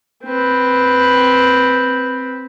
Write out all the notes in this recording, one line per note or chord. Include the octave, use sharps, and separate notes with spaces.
C4 B4